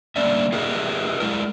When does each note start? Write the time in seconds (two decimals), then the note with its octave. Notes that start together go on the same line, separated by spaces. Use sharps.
0.16 D3 G3 A#3 C#4 D5 E5
0.52 F4 G4 G#4 A#4 D#5 E5
1.20 G#3 E4 A#4